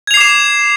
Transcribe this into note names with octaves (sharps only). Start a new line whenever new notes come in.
D6 G#6 C7 E7 F7